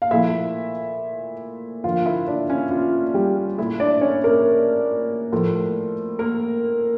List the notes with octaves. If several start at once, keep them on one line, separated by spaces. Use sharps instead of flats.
F5
A#2 F3 A3 E4 E5
D3 F3 A#3 F4 F5
E4 E5
D4 D5
C#4 C#5
F4
G3 G4
A#2 A3 E4 E5
D4 D5
C#4 C#5
A#3 A#4
A2 F3 A#3
A#3 A#4